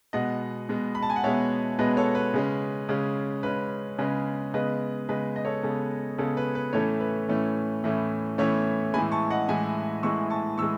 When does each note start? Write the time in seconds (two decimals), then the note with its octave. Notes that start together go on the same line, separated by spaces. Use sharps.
0.13 B2 G#3 B3 D#5 F#5
0.69 B2 G#3 B3
0.95 B5
1.02 A5
1.10 G#5
1.16 F#5
1.24 B2 G#3 B3 C#5 E5
1.79 B2 G#3 B3 B4 D#5
1.97 A4 C#5
2.15 B4
2.34 C#3 G#3 C#4
2.89 C#3 G#3 C#4
3.43 C#3 G#3 C#4 B4
3.99 C#3 G#3 C#4 B4 D#5
4.54 C#3 G#3 B3 B4 D#5
5.09 C#3 G#3 B3 B4 D#5
5.36 D#5
5.45 A4 C#5
5.63 C#3 G#3 B3 A4
6.18 C#3 G#3 B3 A4 C#5
6.37 B4
6.55 B4
6.73 A2 E3 A3 C#4 A4 C#5
7.00 B4
7.28 A2 E3 A3 C#4
7.84 A2 E3 A3 C#4
8.38 A2 E3 A3 C#4 C#5 E5
8.94 A2 E3 G#3 G#5 B5
9.12 A5 C#6
9.30 D#5 F#5
9.48 A2 E3 G#3 E5 G#5
10.03 A2 E3 G#3 C#6 E6
10.30 A5 C#6
10.58 A2 E3 G#3 C#6 E6